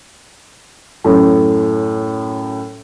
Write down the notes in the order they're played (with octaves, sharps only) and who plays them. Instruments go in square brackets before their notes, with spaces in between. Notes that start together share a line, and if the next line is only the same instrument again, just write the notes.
[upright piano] F#2 A2